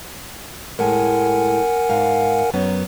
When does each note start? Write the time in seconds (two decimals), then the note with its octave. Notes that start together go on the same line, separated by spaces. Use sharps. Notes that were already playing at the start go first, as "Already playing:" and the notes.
0.79 A2 G#3 A#4 F#5 G#5
1.90 G#2 F5
2.54 F#2 B3